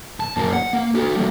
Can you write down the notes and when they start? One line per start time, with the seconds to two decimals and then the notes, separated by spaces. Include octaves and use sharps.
0.20 A5
0.37 F#2 A#3
0.53 F#5
0.73 A#3
0.95 F#4 A4
1.16 G3 A#3